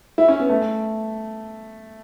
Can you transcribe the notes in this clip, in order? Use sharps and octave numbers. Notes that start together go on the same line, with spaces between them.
E4
C#4
B3
A3